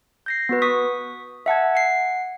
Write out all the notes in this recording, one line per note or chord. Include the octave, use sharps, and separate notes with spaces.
G6 A#6 C7
B3 F#4 B4
C#6 D#6 B6
E5 F#5 A5 G#6
F#5 C7